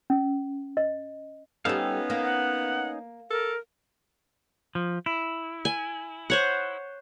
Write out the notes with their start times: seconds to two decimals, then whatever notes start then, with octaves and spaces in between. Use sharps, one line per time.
0.10 C#4
0.77 D#5
1.65 G3 B3 C#4 D#4 A4 F5
2.10 A#3
2.24 F#5
3.30 A4 A#4
4.75 F3
5.06 E4
5.65 G#5
6.30 C5 C#5 F#5